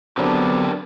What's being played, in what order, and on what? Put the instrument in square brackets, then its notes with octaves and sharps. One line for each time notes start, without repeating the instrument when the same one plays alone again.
[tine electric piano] D3 F#3 C4 [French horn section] B3 [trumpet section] D4 [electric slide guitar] G4 A#4 B4